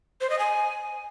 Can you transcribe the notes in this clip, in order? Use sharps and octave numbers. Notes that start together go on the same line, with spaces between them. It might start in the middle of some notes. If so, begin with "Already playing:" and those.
C5
D#5
G#5